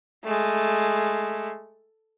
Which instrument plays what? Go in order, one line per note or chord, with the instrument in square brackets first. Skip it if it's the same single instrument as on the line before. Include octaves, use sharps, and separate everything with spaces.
[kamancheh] G#3 A3